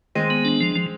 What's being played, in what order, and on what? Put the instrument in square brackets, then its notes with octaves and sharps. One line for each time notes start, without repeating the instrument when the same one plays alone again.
[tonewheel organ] D#3 [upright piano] G#3 C4
[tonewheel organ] B3
D4
F3
F3